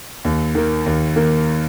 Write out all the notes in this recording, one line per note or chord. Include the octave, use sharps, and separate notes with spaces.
D#2
D#3 A#3
D#2
D#3 A#3